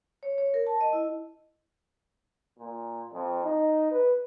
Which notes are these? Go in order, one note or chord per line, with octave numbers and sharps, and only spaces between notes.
C#5
C#5
A#4
A5
D#5
E4
A#2
F2
D#4
B4